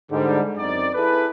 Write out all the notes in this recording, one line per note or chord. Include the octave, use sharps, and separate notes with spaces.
G#2 D3 G3
F#2 C4 D#4 D5
E4 G#4 A4 B4